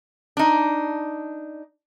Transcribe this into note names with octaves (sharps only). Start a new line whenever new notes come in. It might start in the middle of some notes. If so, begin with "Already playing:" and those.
D4 D#4